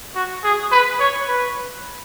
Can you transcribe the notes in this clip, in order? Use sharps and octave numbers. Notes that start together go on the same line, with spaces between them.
F#4
G#4
B4
C#5
B4